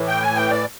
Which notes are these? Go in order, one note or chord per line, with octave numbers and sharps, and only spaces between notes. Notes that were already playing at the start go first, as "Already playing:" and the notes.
Already playing: A2 E3
G5
G#5
G5
D5